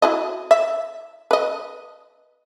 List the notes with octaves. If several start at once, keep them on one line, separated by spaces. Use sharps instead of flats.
E4 F#4 D#5
E5
B4 D#5